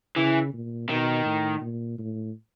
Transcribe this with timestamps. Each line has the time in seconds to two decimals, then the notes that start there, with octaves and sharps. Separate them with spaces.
0.16 C#3 E3
0.53 A#2
0.89 B2 D#3
1.25 A2
1.61 A#2
1.99 A2